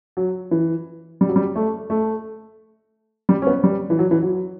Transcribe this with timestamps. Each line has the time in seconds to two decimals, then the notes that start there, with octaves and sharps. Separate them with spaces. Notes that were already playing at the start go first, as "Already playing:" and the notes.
0.17 F#3
0.51 E3
1.21 G3
1.29 F#3
1.36 G3
1.56 A3
1.90 A3
3.29 G3
3.42 C#4
3.47 B3
3.64 G3
3.90 E3
3.99 F#3
4.11 E3
4.23 F#3